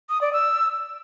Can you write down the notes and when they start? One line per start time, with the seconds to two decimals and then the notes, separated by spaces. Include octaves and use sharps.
0.09 D#6
0.21 D5
0.33 E6